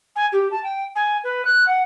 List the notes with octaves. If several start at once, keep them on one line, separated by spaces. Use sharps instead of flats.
G#5
G4
A5
G5
G#5
B4
F#6
F#5